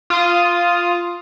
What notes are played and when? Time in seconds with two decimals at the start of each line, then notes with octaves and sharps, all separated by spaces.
0.10 F4 D#6